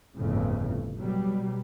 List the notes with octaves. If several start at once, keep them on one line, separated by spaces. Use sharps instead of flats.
G1 F2 A2 C#3
B2 F#3 G3